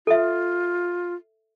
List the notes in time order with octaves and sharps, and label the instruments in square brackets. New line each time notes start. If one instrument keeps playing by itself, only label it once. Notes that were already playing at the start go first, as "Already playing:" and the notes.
[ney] F4 [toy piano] A4 E5